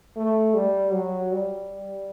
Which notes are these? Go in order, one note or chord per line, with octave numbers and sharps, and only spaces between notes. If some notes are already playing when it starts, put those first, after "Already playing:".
A3
G3
F#3
G3